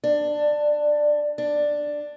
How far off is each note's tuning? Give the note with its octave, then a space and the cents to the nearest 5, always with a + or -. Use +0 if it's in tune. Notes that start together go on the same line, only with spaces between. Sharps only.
D4 +10
D4 +5